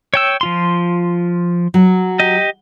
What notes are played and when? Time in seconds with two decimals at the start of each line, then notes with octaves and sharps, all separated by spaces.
0.14 C#5 G5 E6
0.41 F3 F4 C6
1.74 F#3
2.19 G4 D#5